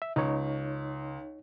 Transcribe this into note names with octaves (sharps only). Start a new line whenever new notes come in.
E5
C#2 D#4 C#5